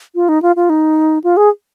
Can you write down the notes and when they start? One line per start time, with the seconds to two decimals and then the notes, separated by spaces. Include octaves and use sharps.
0.15 F4
0.29 D#4
0.42 F4
0.56 F4
0.70 D#4
1.24 F4
1.37 G#4